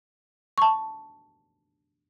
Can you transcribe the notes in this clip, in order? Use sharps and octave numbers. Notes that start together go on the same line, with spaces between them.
A5 C#6